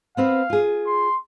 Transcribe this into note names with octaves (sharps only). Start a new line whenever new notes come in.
B3 C4 B4 F5
F4 G#4
C6